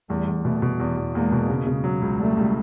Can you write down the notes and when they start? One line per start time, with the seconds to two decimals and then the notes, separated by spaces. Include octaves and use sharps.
0.10 E2 G3 A3
0.28 E2
0.44 B2 G3 A3
0.62 B2
0.80 E2
0.97 E2
1.15 E2 G#3 A#3
1.32 B2
1.50 C#3
1.67 C#3
1.84 F#3
2.02 C#2
2.19 F#3 G3 A3
2.37 C#2